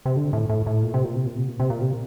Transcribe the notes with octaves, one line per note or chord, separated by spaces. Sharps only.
C3
D3
A2
A2
A2
A#2
C3
A#2
C3
A#2
C3
A#2
C3
A#2
C3